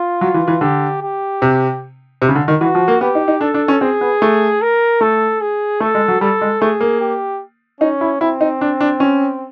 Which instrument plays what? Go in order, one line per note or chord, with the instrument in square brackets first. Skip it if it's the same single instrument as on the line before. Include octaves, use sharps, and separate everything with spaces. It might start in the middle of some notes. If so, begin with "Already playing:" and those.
Already playing: [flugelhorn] F4
[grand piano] F#3
E3
E3
[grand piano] D3 [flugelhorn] G4
[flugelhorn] G4
[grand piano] C3
C3
C#3
D3
D#3
[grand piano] E3 [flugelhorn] F#4
[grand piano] F3
A#3
[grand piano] B3 [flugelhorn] G4
[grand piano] D#4
D#4
[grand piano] D4 [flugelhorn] A4
[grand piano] D4
C#4
[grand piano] C4 [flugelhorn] G#4
[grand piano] B3
A3
[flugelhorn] A#4
[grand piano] A3 [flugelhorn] A4
[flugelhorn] G#4
[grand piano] A3 [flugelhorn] A4
[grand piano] G#3
F#3
[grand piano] G3 [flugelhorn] A4
[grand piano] G#3
[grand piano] A3 [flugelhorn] G#4
[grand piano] A#3
[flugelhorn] G4
[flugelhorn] C#4 [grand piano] D#4
[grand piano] E4
[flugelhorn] C4 [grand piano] E4
[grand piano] D#4
D4
D4
C#4